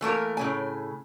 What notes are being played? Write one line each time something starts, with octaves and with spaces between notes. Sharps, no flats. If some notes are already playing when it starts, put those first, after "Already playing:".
E3 A3 A#3 A#4
A2 C#3 G#5